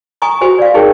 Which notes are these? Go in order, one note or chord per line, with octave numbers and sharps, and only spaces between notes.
G#5 A#5 C#6 D#6
F#4 G4 C5 G#5
D5 F5
D#4 G4 G#4 A#4 C#5 G5